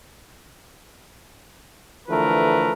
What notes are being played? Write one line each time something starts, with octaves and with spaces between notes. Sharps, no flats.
D3 E3 F3 A3 A#4 B4